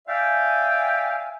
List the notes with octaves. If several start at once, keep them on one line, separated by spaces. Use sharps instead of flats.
D5 E5 F5 G5 G#5